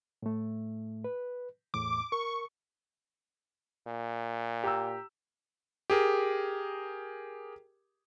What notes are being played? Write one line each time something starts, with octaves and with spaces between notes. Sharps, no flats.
A2 A3
B4
E2 A2 D6
A#4 C#6
A#2
G4 A#5 E6
G4 G#4 A#4